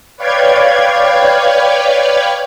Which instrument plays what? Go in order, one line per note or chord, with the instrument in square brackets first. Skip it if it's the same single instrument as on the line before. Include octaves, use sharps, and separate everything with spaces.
[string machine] B4 C#5 D5 F5 G5 G#6